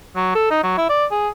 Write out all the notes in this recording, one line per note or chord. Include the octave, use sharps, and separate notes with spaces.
F#3
A4
D#4
F#3
E4
D5
G#4